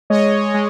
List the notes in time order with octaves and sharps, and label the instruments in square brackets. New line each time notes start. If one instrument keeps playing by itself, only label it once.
[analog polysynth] G#3 C#5 D#5
G#3